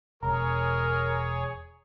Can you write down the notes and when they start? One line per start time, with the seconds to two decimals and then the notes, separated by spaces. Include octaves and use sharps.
0.23 E1 G#4 A#4 C#5 A#5